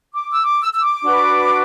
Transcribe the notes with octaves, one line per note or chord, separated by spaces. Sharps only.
D6
E6
D6
E6
E6
D6
D4 F#4 B4